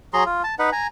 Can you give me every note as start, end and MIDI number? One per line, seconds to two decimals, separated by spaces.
0.14 0.24 54
0.14 0.24 68
0.14 0.24 82
0.14 0.24 84
0.26 0.42 65
0.44 0.55 81
0.59 0.70 63
0.59 0.70 71
0.59 0.70 78
0.72 0.87 80
0.72 0.87 82